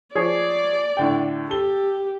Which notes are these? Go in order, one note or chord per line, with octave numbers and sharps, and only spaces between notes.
F3 G#4 C#5 D5
A2 D3 G5
G4 A4 G7